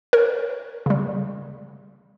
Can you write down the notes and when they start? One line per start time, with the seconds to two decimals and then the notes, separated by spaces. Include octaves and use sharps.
0.13 A#4 C#5
0.86 C#3 G3